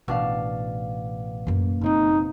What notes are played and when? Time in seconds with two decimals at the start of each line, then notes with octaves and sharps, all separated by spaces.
0.08 A1 B2 D4 F5
1.47 F#2 A#3
1.81 F#1 C#3 C4 D#4